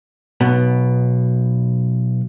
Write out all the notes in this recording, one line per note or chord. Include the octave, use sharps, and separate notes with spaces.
B1 B2 B3